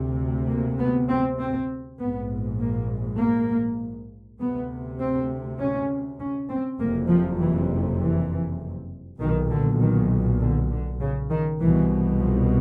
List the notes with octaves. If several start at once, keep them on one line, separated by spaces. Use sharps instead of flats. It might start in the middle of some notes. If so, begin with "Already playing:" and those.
Already playing: D2 C3
A#3
B3
C4
C4
A#1 G#2 B3
A#3
A#3
D2 C3 B3
C4
C#4
C#4
C4
F#1 F2 C3 A#3
F3
E3
E3
B1 A#2 D#3
D3
D#3
D3
D3
C#3
D#3
C2 B2 E3
F3